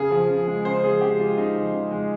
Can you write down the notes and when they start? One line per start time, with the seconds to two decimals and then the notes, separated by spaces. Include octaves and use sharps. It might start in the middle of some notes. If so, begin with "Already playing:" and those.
Already playing: C#3 G#4
0.11 F3
0.29 C#3
0.47 G#3
0.65 C#3 C5
0.83 F3 G#4
1.01 C#3 G4
1.19 G#3 F4
1.38 C#3 D#4
1.56 F3
1.73 C#3
1.91 G#3